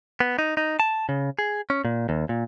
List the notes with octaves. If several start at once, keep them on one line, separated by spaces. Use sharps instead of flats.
B3
D#4
D#4
A5
C#3
G#4
C#4
A#2
D#2
A#2